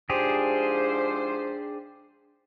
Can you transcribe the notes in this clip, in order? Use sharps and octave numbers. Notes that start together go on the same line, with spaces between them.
G#2 F3 D4 G4 G#4 C5